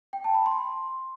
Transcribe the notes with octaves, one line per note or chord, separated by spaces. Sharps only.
G5
A5
B5
C6